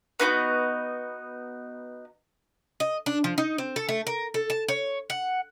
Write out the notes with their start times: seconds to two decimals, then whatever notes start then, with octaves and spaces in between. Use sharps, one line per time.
0.20 B3 D#4 F4 F#4
2.80 D#5
3.06 D4
3.24 F3
3.38 D#4
3.58 C4
3.76 A4
3.89 A3
4.07 A#4
4.34 A4
4.50 A5
4.68 C#5
5.10 F#5